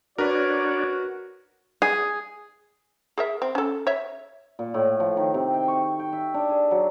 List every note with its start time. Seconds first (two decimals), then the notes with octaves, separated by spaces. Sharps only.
0.18 D4 F#4 A#4 B4 C#5 D5
1.82 G#4
3.18 G#4 A#4 E5
3.42 C4
3.55 C#4 A4
3.87 C#5 E5
4.59 A#2
4.74 A2
5.00 F3
5.17 D#3
5.34 C3
5.54 G5
5.68 C#6
5.99 G5
6.13 E5
6.34 D4
6.50 G#4
6.71 F#3